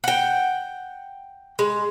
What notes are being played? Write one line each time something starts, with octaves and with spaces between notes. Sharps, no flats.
F#5 G5
G#3